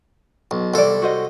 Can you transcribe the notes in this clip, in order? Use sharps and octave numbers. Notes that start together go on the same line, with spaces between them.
B1
C2 A4 C5 D5
F#4 C5 D#5